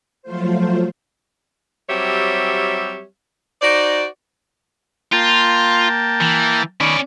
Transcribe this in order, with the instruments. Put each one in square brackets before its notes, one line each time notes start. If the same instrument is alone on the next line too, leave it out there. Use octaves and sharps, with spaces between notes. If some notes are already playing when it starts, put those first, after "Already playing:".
[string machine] F3 F#3 A3 F4 C5
[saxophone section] F#3 G3 C4 G4 C#5 E5
D#4 F#4 C5 D5
[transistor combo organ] A#3 G5 A5 [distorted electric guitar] F4
[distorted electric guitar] E3
[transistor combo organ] D#3 B5 C#6 [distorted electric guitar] C#4 D5